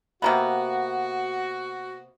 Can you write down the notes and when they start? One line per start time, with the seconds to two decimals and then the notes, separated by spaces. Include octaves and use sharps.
0.22 C3 A#3 B3 F#4